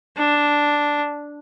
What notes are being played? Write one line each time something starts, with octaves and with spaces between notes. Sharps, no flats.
D4